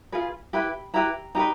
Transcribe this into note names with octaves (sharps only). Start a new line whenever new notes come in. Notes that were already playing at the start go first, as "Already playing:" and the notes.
F4 G#4 B4
E4 G4 B4 B5
E4 G4 B4 A#5
D#4 G4 B4 A#5